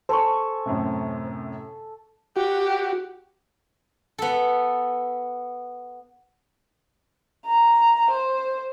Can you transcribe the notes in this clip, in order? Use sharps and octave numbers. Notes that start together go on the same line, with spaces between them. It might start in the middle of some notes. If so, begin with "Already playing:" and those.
A4 C5 G#5 C#6
F#2 A2 C3
F#4 G4
B3 A4
A#5
C5